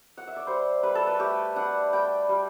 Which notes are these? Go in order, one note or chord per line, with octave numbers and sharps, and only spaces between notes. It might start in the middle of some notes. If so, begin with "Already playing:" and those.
F#5
E5
D5
G3 C5
G3 B4
A4
B4
A3 G4
D4 F#5
G3 G5
G3